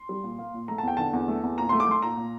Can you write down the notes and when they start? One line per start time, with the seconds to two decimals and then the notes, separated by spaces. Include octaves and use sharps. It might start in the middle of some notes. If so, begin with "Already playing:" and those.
Already playing: C6
0.09 G3
0.23 A#2
0.39 A#3
0.54 A#2
0.68 A3 A#5
0.78 A5
0.83 E2 G5
0.97 D3 A5
1.13 E2
1.28 A3
1.43 E2
1.58 A#2 A#5
1.69 A3 C6
1.80 D6
1.87 A3 C6
2.02 A#2 A#5
2.17 A#2